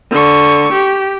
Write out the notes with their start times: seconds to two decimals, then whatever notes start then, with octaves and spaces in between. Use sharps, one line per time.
0.11 D3 C#6
0.73 G4